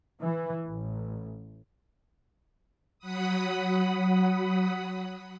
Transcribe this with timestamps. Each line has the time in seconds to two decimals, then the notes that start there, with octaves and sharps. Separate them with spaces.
0.20 E3
0.66 A1
2.99 F#3 F#5 B5 D#6